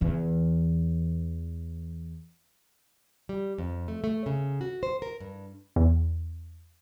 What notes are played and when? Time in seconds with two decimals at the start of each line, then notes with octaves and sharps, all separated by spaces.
0.01 E2 E3
3.29 G3
3.58 F2
3.88 A3
4.04 A3
4.26 C#3
4.61 F#4
4.83 C5
5.02 A#4
5.20 G2
5.76 E2